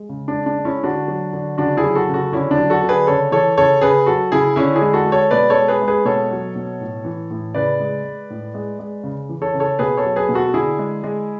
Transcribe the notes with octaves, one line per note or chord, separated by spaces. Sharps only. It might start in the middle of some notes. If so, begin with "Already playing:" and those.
Already playing: G#3
C#3
D4
G#3
D4
G#3
C#4 E4
D3 D4 F#4
F#3
D3
C#3 D4 F#4
E4 G#4
F#3
F#4 A4
C#3
F#4 A4
D3 C#4 E4
D4
F#3
F#4 A4
D3
G#4 B4
C#3 A4 C#5
E3 A4 C#5
C#3 A4 C#5
C#3 G#4 B4
F#3 F#4 A4
C#3 E4 G#4
D3 C#4 E4
E4 G#4
G#3
F#4 A4
G#3
A4 C#5
B2 B4 D5
A4 C#5
G#3
G#4 B4
G#3
G#4 B4
B2 A4 C#5
F#3
B2
A2
E3
A2
C#3 B4 D5
G#3
G#3
A2
G#3
G#3
C#3
E3
A4 C#5
C#3
A4 C#5
B2 G#4 B4
A4 C#5
F#3
G#4 B4
B2
F#4 A4
D3 E4 G#4
G#3
G#3